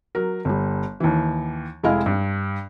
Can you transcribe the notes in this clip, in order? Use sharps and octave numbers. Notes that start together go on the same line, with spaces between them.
F#3 A#4
G1 G3
D#2 E3
F1 G#3 E4 D#5 F5 F6
G2